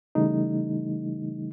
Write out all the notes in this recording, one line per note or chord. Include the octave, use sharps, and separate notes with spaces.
C#3 E3 G3 A3 D#4